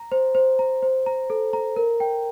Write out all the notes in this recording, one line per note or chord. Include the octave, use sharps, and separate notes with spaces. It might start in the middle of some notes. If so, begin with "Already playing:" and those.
Already playing: A#5
C5
C5
A#5
C5
A#5
A4
A#5
A#4
G5